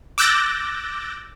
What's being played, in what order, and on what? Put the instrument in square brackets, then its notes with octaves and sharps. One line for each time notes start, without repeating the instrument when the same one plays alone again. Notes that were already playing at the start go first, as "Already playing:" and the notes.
[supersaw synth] D6 E6 F#6 G6 A6 A#6